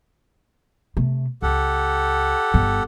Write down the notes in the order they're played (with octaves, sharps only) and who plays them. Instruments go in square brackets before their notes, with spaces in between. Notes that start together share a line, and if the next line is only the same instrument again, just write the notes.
[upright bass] C3 A3
[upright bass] C#2 [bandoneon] G4 A4 F#5
[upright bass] G1 G2